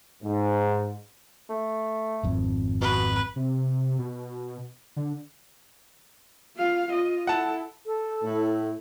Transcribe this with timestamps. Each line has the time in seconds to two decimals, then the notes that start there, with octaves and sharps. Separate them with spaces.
0.23 G#2
1.50 A3
2.23 G#1 F2
2.82 B2 B4
3.36 C3
3.99 B2
4.96 D3
6.57 F4 F5
6.88 F4 D#5
7.27 E4 A4 F#5 A5
7.86 A4
8.23 A2